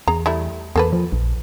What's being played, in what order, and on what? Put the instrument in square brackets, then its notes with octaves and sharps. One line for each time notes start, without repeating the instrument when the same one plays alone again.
[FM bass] E2 [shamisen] G#4 A#5
[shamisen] G3 A3 E4
[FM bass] E2 [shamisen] A#3 A4 B4
[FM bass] F3
A#1